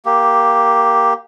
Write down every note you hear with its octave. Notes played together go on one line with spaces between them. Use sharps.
A#3 G4